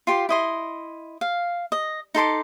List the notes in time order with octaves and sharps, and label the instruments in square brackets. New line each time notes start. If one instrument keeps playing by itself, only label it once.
[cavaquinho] F4 G4 C6
E4 D#5 C6
F5
D#5
D#4 A4 C6 D6